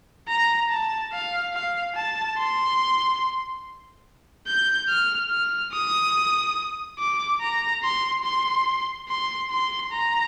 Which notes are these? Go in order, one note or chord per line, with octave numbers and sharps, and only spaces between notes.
A#5
A5
F5
F5
A5
C6
G6
F6
F6
D#6
D6
A#5
C6
C6
C6
C6
A#5